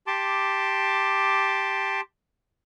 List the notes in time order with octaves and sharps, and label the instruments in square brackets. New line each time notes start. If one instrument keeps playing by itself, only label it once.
[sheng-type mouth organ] G4 A5 C6 D6